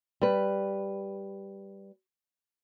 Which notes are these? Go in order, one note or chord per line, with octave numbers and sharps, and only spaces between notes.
G3 B4